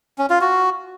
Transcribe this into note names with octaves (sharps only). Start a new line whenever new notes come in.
C#4
F4
F#4